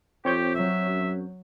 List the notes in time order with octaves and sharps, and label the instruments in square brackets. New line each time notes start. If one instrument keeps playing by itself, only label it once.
[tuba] F2 [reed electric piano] C4 C#5 G6 [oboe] G4
[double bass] F#3 [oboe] E5
[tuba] F#2